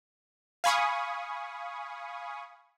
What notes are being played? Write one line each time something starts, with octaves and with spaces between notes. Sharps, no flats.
F5 G#5 B5 C#6 D#6